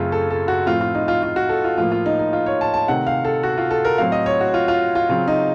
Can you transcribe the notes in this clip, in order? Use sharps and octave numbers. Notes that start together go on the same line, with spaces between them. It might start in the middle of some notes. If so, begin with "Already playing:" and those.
Already playing: F#2 C#3 A3 C4 F4 A4
A4
A4
F#4
A2 F3 A3 C4 F4
F4
D#4
F4
F4
F#4
A4
F4
A2 F3 A#3 F4
F4
D#4
D#4
F4
C#5
A5
A5
C3 D#3 A3 C4 F#5
F5
A4
F#4
F4
A4
A#4
A2 F#3 C4 F5
D#5
C#5
F#4
F4
F4
F4
C#3 F#3 C4 F4
D#4